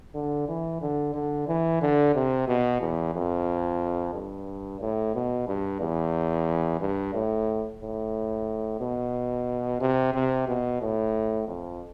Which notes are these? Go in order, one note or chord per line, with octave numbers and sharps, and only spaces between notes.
D3
E3
D3
D3
E3
D3
C3
B2
E2
F2
G2
A2
B2
G2
E2
G2
A2
A2
B2
C3
C3
B2
A2
F2